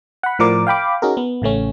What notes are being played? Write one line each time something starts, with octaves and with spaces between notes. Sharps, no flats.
F#5 B5
A2 F3 A#4 D5 D6
F5 G5 B5 D6
C#4 D#4 F#4 G#4 A#4
B3
A1 C#3 A3 C#4